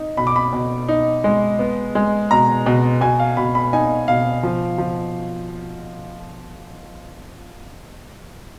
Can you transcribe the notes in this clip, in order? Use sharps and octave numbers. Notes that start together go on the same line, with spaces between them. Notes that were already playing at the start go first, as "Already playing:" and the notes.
Already playing: D#4
B2 B5
D6
B5
B2
D#4
G#3
B3
G#3
B2 A#5
B2
B2 G#5
F5
B2 B5
B5
D#4 G#5
B2 F5
F3
F3